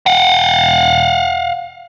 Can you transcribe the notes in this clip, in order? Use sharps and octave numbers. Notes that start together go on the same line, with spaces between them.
F5 F#5